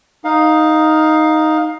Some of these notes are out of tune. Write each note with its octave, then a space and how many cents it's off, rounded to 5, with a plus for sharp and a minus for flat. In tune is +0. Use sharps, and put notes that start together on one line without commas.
D#4 +0 F5 +15